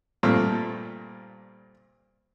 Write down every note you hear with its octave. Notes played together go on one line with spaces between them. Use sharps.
G2 A#2 A3 A#3 C4